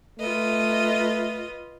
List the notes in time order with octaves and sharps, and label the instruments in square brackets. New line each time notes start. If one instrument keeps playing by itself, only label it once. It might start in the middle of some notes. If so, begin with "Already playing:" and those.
[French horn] A3 [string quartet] F4 B4 D#5